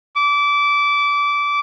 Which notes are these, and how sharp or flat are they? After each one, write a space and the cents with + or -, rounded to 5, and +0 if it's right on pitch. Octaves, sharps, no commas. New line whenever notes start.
D6 -20